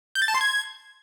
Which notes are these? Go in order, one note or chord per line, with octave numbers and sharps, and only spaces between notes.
G6
A6
A5
C6
G#6